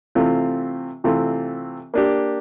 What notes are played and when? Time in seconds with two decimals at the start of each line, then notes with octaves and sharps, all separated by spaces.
0.15 C3 E3 A3 C4 F4
1.04 C3 E3 A3 C4 F4
1.94 A#3 D4 G4